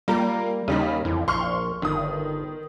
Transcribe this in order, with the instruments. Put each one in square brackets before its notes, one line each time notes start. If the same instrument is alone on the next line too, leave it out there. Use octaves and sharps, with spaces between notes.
[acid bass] G3 [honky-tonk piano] A#3 F4 A#4
[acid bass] D#2 [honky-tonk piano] C#3 G3 D#4
[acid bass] F2 [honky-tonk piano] E3
[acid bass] A#1 [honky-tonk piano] C6 C#6 F6
[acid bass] G1 [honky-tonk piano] D#3 D#6